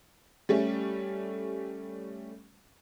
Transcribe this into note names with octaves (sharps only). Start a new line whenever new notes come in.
G3 A3 C#4